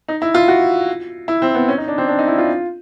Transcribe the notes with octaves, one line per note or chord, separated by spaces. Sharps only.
D#4
E4
F4
F#4
E4
C4
B3
C#4
D#4
D4
C4
D4
D#4
E4
F4